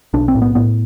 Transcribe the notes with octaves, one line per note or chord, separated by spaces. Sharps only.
B1 D4
C4
A2
B3
A2 B3